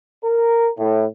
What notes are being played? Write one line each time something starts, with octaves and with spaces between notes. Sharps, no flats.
A#4
A2